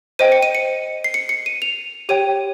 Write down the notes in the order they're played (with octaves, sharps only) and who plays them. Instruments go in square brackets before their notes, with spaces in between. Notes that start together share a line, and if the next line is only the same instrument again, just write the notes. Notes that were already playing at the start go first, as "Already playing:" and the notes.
[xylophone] C5 D#5 G5 D#7
C#7
D#7
C#7
C7
C#7
C#7
D#7
F7
G4 C#5 G5 D#7